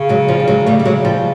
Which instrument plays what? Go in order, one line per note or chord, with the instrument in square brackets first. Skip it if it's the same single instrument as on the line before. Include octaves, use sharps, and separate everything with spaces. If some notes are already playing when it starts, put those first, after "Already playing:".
Already playing: [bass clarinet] C#3
[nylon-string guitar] F#3 G#3
F3 G3
G3
F#3 G#3
[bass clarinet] C#3 [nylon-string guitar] G3 A3
[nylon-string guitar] G3
F#3 G#3
F3 G3